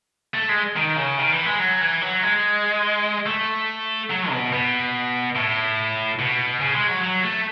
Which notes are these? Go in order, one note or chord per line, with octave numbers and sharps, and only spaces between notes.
A3
G#3
D#3
C#3
D#3
E3
G#3
F#3
E3
F#3
G#3
A3
F#3
B2
B2
A2
B2
C#3
G#3
F#3
F#3
A3